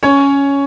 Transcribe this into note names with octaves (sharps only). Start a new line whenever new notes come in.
C#4 C#5